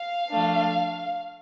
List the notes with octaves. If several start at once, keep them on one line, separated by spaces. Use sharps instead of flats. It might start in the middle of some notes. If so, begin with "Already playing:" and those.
Already playing: F5
F3 A3 D4